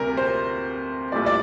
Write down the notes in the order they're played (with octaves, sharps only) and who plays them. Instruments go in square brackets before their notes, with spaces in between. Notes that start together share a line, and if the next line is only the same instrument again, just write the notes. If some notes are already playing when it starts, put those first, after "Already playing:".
Already playing: [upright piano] D2 C3 G3 A#4
C5
A#1 A2 G3 D5
D5